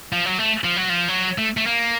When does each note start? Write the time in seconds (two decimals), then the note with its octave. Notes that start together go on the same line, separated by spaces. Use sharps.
0.13 F3
0.26 F#3
0.39 A3
0.64 F3
0.76 F#3
0.90 F3
1.08 F#3
1.38 A3
1.57 A3
1.66 A#3